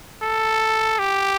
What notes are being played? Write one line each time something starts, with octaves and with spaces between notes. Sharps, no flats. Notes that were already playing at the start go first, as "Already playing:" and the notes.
A4
G4